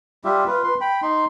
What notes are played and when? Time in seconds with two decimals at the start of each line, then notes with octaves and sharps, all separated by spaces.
0.25 G3 F4 G4 E5
0.47 F4 B4
0.64 B4 C6
0.81 G5 B5
1.02 D#4 C6